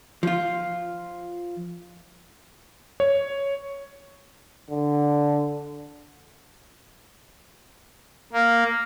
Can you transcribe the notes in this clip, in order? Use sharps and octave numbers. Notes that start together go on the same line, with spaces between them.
F3 F4
C#5
D3
A#3